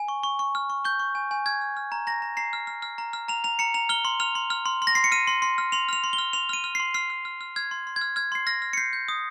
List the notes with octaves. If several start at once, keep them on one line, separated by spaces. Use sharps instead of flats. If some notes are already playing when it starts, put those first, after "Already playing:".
Already playing: G#5
C#6
C#6
C#6
F6
C#6
C#6 G6
C#6
G#5
G#5
F6 G#6
F6
F6
A#5
A#5 A#6
A#5
A#5 C7
F6
F6
F6
A#5
F6
A#5 F7
A#5 F7
A#5 C#7
A#5 F7
F6 G7
C6
F6 F7
C6
F6
C6
C6
A#6
C6 C7
C#7
F6 D#7
C6
C6
F6
C6 F7
F6 F7
C6
G7
F6
C6 F7
F6 D#7
F6
C7
C6
F6 C7
F6
F6
F6
F6 G#6
C6
C6
G#6
F6
F6 G#6
C6 C7
F6 A#6
F6
C#7
G6 C7
G6
D#6